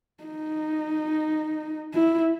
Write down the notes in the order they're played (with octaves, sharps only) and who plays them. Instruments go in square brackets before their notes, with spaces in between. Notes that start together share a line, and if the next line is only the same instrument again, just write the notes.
[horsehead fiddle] D#4
E4